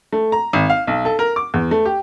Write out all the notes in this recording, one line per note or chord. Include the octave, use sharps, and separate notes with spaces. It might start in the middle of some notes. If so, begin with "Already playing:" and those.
A3
A#5
G#1
F5
B1
A4
A#4
D6
E2
A3
G4